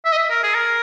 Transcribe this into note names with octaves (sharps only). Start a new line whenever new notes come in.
E5
D#5
E5
A#4
G#4
A#4